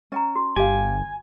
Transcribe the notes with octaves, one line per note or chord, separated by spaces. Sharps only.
C#4 D#5 G5 A#5
F#4
G1 G4 F5 G#5